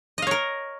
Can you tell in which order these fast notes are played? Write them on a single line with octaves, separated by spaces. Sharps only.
D#5 F5 C#5 A#4